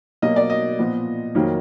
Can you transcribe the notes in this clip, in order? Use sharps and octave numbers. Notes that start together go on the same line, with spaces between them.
B2 F#3 A#3 D#5
D5
D#5
A#2 F3 B3
F2 D#3 F#3 A#3